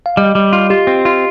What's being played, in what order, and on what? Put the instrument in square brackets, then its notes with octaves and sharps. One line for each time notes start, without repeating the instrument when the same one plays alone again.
[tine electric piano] F5
[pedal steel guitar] G3 [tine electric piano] D#5
[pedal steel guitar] G3
F4
[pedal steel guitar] F4 [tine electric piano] G4
[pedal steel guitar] C4
F4